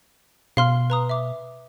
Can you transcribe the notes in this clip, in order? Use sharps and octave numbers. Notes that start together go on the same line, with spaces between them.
B2 F5 C6 F6
B4 A#5 D#6
E5 D6